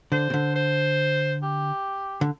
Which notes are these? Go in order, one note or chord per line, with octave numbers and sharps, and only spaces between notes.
D3 C5
C3
D3
C5
G4
D3